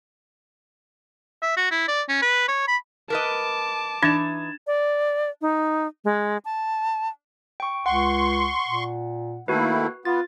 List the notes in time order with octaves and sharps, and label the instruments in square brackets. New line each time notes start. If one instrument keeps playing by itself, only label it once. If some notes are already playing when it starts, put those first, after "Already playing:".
[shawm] E5
F#4
E4
D5
C#4
B4
C#5
B5
[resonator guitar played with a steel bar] A#4 B4 D#5 [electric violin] A5 D6
[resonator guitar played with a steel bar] E3 D#4 [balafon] D4 [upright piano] G#6 A6 E7
[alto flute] D5
D#4
G#3
A5
[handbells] G5 C#6
[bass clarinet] C#2 [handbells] F#5 [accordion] C6 C#6
[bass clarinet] A#2
[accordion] D#3 A3 E4 [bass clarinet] A#3 [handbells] F#4 B4
[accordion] B3 [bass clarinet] F4 [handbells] A6